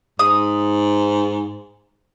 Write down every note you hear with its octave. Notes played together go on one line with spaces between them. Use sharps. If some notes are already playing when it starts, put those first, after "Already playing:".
G#2 D#6